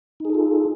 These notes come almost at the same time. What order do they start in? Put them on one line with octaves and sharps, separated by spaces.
D#4 G#4 A4 F4